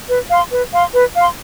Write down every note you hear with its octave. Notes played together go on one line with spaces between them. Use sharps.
B4
F5 C6
B4
F5 C6
B4
F5 C6